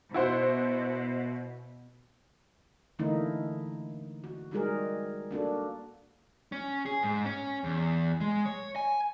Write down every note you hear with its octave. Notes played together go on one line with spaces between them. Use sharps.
B2 E4 F#4 C5
D3 E3 A3 A#3 D#4 E4
F#4
G3 G#3 D#4 F#4 G#4 A#4
A#3 D4 F#4 A4
C#4
G#4
G#2
C#4
E2
G#3
C#5
G#5